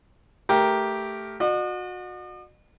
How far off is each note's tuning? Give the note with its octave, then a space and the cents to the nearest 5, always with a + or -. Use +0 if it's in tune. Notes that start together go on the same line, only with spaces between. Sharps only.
A3 +0 G4 +0 A#4 +10
F#4 -30 D#5 -45